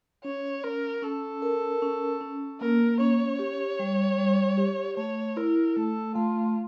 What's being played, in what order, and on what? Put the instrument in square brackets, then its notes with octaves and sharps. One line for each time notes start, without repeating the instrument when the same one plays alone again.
[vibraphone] C#4 [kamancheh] C#5
[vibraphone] C#4 [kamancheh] A#4
[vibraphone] C#4 [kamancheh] A4
[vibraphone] A#4
C#4
C#4
[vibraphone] A#3 [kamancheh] A#4
[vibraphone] C#4 [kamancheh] C#5
[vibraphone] G4
G3
G3
G4
[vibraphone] A3 [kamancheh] C#5
[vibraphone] E4 [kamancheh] A#4
[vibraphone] A3 [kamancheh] A4
[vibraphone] A3 [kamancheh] F4